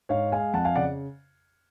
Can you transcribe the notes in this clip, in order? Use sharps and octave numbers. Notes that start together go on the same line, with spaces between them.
G#2 C#5 F5
G#3 F5 G#5
F2 F#5 A5
F5 G#5
C#3 D5 F#5